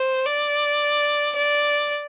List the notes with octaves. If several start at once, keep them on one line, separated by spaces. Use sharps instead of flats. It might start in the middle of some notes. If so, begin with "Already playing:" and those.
Already playing: C5
D5
D5